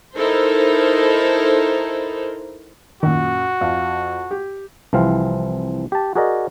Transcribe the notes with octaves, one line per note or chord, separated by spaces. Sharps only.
D#4 E4 A4 A#4 C5
F#2 A#2 D#3 F#4
F2 F5
G4
C2 E3 F3 C4 F5
G4 A5
F#4 G#4 A#4 D5 D#5